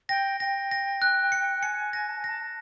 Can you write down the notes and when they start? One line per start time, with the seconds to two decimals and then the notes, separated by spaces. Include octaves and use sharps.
0.09 G5 A#6
0.40 G5 A#6
0.71 A#6
1.02 F#6
1.32 C#7
1.63 G#5 C#7
1.93 A#6
2.09 A5
2.18 G#5
2.24 A5 A#6
2.43 A5